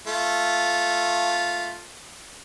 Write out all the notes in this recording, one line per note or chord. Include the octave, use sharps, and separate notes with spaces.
A3 F4